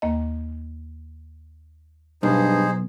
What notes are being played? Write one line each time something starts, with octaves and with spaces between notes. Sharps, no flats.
D#2 A#3 D#5
B1 G2 D#4 G#4 C5